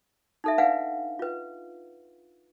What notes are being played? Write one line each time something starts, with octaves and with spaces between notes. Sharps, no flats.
D#4 A4 E5
D4 B4 F5 F#5 G#5
F4 B4